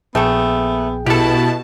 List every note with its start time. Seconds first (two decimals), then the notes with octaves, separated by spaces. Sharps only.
0.15 A#1 A3 B3 G#4 A4 G5
1.06 B2 E4 G4 A4 A5